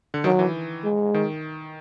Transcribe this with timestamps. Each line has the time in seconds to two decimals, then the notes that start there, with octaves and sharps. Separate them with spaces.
0.14 D3
0.24 D#3 F#3
0.39 E3
0.84 G#3
1.14 D#3